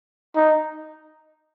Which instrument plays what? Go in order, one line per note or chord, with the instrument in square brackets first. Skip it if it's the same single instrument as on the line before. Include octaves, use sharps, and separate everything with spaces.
[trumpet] D#4